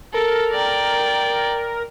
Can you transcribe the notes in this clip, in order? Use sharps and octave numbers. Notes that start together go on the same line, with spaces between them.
A4 A#4
D5 G5